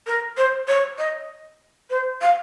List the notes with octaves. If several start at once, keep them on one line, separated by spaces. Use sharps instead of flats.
A#4
C5
C#5
D#5
C5
F5